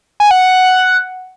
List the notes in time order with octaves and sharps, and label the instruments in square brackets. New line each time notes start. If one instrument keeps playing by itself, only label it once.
[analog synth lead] G#5
F#5
F#5